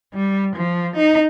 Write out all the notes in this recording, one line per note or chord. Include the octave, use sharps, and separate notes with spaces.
G3
F3
D#4